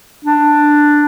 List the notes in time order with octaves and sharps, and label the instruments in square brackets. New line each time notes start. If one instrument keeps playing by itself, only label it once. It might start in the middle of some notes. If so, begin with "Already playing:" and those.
[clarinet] D4